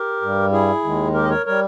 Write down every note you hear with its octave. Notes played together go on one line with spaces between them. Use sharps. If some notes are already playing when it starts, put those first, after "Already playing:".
Already playing: G4 A#4
G2 G3
E4 G#4
D#2 D#3 G#3
G4 A#4
D#5
A#4 C#5
G3 A#4 C#5